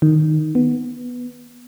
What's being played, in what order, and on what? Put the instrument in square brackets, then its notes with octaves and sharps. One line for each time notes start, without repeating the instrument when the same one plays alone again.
[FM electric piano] D#3
B3